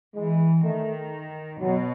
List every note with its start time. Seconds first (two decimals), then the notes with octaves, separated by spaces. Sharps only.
0.15 E3 G#3
0.63 D#3 A3
1.60 B2 F#3